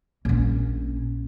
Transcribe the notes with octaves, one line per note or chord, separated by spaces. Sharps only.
A#1 C#4